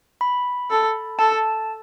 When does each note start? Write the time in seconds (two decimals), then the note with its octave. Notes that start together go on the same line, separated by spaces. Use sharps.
0.21 B5
0.70 A4
1.19 A4 A5